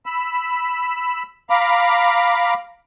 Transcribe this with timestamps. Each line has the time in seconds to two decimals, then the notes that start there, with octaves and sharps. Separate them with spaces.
0.06 B5 E6
1.50 F5 A#5 B5 D6